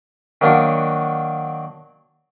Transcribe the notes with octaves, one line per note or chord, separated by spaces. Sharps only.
D#3 F#3 A#3 D4 F#4